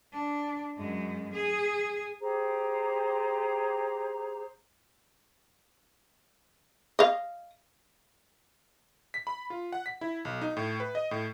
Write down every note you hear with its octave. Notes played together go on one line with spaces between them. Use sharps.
D4
F#2 G#3
G#4
G4 G#4 C5 A#5
D#5 F5
B6
B5
F4
F#5
B6
E4
B1
D#4
A2
B4
D#5
A2